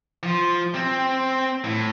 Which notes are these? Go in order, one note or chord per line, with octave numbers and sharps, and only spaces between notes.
F3
C4
A2